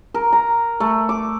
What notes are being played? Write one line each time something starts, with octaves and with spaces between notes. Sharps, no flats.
A#4
A#5
A3
D6